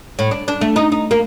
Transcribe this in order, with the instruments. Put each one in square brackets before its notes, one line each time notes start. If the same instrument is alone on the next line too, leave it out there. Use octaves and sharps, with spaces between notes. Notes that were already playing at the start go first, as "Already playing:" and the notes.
[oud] A2
D4
D4
A3
D#4
D#4
A#3